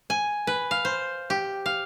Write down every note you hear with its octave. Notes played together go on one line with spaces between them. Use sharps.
G#5
B4
F5
C5
G4
F5